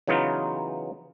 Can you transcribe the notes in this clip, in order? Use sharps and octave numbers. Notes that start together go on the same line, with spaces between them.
C#3 E3 F#3 B3 D#4 F4